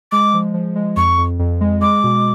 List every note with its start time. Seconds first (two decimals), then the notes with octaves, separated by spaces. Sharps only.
0.12 G#3 D6
0.34 F3
0.54 F3
0.76 G#3
0.97 F2 C#6
1.18 F2
1.39 F2
1.61 G#3
1.82 G#3 D6
2.04 B2